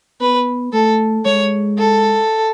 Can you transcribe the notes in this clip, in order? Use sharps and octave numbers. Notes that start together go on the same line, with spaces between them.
B3 B4
A3 A4
G#3 C#5
A4